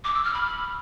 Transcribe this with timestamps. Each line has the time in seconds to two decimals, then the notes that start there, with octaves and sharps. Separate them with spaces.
0.04 D6
0.14 E6
0.24 F6
0.34 B5